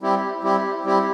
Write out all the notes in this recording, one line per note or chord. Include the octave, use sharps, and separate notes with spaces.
G3 C4 E4 G4
G3 C4 E4 G4
G3 C4 E4 G4